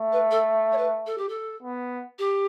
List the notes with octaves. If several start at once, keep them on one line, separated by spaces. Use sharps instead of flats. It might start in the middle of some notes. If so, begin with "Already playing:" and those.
Already playing: A3
B4
A4
C#5
B4
A4
G4
A4
B3
G4